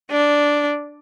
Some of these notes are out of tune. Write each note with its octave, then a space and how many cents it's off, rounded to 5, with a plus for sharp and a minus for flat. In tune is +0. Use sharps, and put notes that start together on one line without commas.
D4 -5